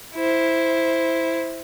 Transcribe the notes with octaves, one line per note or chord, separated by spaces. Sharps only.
E4 C5